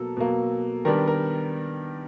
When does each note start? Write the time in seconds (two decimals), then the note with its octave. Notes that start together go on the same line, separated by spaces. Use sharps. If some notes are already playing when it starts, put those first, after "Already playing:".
Already playing: B2 F#3 A#3 A4
0.17 B2 F#3 A#3
0.85 D#3 G3 B3 D4 A#4
1.08 A#4